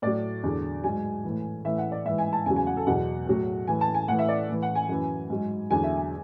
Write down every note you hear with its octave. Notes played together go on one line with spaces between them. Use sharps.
A2 F#3 D5
E2 D3 F#3
G#2 F#3 G#5
A2 E3
A2 E3 E5
F#5
D5
G#2 E3 E5
G#5
A5
E2 C#3 F#3 G#5
G#5
F#5
A4
E2 B2 F#3 F#5
A2 F#3
A2 E3 G#5
A5
G#5
A2 E3 F#5
E5
D5
A2 E3
F#5
G#5
F#2 E3
G#2 F#3
E2 D3 F#3 G#5
E5
G#5